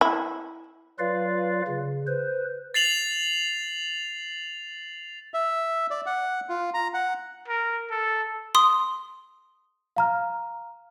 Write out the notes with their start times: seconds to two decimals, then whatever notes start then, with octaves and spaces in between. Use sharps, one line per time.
0.01 E4
0.99 F#3 F4 B4 D5 F5
1.68 C#3
2.07 B4 C5
2.74 A6 C7 F7 F#7
5.34 E5
5.91 D5
6.06 F#5
6.49 F4
6.74 A#5
6.94 F#5
7.48 A#4
7.90 A4
8.55 C6 D#6
9.97 F5 A#5 F6